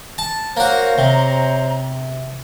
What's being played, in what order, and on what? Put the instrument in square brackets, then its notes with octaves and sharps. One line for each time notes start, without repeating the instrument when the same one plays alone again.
[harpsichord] A5
[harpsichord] A#3 F#4 [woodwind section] C5 C#5 A#5
[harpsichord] C3